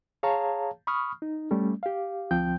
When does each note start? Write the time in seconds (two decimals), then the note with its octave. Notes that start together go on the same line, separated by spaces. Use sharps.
0.23 G#4 C#5 F5 A5 A#5
0.87 B5 C#6 D#6 F6
1.22 D#4
1.51 G3 A3 C#4
1.83 G4 F5
2.31 D2 F3 C4 G5 G6